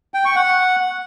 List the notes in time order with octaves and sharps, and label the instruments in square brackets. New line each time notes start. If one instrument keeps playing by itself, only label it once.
[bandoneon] G5
C#6
F#5